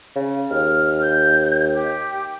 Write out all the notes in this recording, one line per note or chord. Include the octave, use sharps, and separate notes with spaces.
C#3
D#2 F6
G6
G4